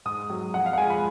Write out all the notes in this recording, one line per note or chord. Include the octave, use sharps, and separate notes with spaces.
G#2 D#6
F#3
F2 F#5
F5
F#5
F3 G#3 G#5
B5